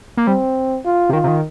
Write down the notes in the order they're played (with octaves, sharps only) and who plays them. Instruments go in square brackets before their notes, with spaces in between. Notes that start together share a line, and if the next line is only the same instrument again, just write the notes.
[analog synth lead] A#3
[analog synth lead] G3 [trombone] C4
[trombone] F4
[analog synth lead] C3
[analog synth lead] D#3 [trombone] F4
[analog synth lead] C3
D#3